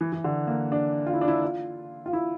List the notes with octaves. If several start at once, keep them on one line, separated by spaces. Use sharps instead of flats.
E3
E3
D3
A#3
D4
F4
E4
D4
E4
F4
F4
E4